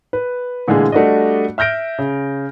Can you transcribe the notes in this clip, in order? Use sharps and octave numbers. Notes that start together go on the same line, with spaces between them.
B4
A#2 D3 E3 G#3 A3 G#4
G3 A3 D4 F#4 D5 D#5
E5 F6 G6 A#6 D7
C#3